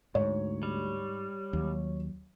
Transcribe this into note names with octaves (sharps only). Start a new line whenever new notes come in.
D2 G#2 C#5
G3
D#2 F#3